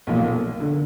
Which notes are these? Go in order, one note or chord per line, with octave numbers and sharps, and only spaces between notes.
B1 A#2 F3 A#3
D3